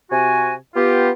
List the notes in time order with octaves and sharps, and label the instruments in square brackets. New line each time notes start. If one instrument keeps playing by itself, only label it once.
[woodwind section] C3 F#4 G#5
B3 F4 G4